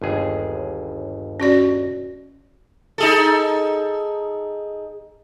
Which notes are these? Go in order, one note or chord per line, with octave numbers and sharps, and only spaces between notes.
G1 D#2 G#4
C#4 F#4 D5
D#4 G#4 A4